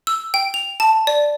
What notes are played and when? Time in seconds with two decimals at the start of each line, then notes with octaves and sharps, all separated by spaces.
0.07 E6
0.34 G5
0.54 F7
0.80 A5
1.07 D5